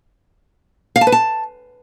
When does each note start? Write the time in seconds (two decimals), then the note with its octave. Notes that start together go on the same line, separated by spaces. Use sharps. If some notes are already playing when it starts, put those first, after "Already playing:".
0.96 F5
1.01 A5
1.07 B4
1.12 A5